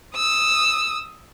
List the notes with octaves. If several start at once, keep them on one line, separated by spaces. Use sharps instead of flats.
D#6 E6